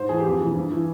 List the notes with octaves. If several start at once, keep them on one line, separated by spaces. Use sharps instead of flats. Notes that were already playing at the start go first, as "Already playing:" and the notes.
Already playing: G#2 C5
E3 G#4
F2 G4
G#4
C3 E3
G2
E3